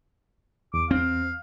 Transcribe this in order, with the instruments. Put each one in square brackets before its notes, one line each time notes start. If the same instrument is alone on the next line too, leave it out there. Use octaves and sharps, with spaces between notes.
[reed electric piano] E2 [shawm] D6
[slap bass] C4 [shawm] F5